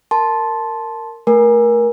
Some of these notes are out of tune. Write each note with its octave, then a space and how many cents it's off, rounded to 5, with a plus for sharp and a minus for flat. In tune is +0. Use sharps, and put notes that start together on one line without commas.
A#4 -15 A5 -10 C6 +0
A3 +0 A#4 +30 G#5 -10